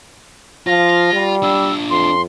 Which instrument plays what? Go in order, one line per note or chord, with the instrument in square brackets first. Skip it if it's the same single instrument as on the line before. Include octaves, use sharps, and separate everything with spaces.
[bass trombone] F3 [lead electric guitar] F4 [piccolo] A#6
[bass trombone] G3
[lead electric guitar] D4 F4 [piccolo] E6
[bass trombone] F2 [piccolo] C6